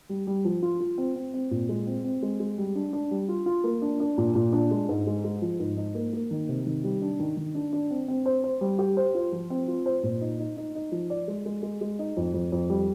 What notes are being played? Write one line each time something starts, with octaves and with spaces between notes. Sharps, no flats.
G3
G3
F3
F4
F4
C4
C4
C4
A#2
G#3
C4
C4
G#3
G#3
G3
D4
D4
G3
F4
F4
A#3
D4
D4
A#2
A#2
D4
G#3
G#2
G#3
G#3
F3
G#2
D#4
A#3
A#3
D#3
C3
D#3
G3
D4
D#3
D#3
D4
D4
C4
C4
C5
C5
G3
G4
C5
F4
F3
C4
F4
C5
A#2
D#4
D#4
D#4
D#4
F3
D5
G#3
G#3
G#3
G#3
D#4
F2
F2
F2
G3